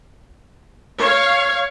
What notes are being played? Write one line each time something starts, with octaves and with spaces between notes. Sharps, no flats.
C#5 F5